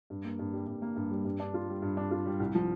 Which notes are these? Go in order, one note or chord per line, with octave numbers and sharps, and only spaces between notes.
G2
A#3
G2
G3
G2
A#3
G2
G3
G2
D4
F4
G3
G2
D4
F4
G3
C2
F3